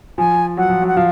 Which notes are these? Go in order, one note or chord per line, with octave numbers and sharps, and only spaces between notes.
F3 G#5
F#3 F#5
F3
F#3
F#5
F3 F5